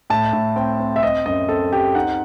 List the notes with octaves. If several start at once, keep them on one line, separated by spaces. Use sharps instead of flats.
A2 A5
A2
C4 G5
C4
E5
C4 D#5
F#2 D#5
C4 A4
C4 G4
D#4 F#5